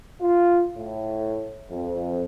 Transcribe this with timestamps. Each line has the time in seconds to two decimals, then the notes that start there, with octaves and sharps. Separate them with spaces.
0.21 F4
0.77 A2
1.70 F2